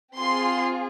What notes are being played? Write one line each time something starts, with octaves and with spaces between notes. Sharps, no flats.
C4 F4 G#4 C6